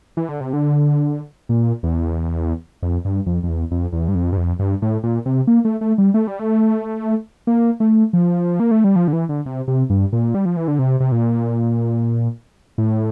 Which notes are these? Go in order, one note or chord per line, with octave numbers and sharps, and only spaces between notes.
E3
D3
C3
D3
A#2
E2
F2
G2
F2
F2
E2
F2
E2
G2
F2
G2
F2
G2
A2
A#2
C3
A#3
A3
A3
G3
A3
G3
A3
A#3
A3
F3
A#3
A3
G3
F3
D3
E3
D3
C3
C3
G2
A#2
G3
F3
E3
D3
C3
C3
A#2
A2